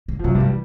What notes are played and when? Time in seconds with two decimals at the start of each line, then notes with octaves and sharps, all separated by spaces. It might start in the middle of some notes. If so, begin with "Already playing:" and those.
0.08 C#3
0.19 F3
0.24 F#2 C3 F#3
0.35 G2 G3
0.40 E3
0.46 G3